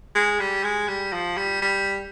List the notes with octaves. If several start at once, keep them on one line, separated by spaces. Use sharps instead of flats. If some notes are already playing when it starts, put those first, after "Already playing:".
G#3
G3
G#3
G3
F3
G3
G3